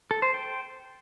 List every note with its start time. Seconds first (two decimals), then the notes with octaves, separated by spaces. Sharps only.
0.11 A4
0.22 C5
0.34 G5